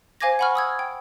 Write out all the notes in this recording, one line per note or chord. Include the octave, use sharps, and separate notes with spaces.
C5 F5 G#5 D6 G#6 A#6
F#5 G#5 B5 C#6 F6
D#6 E6 G#6
G5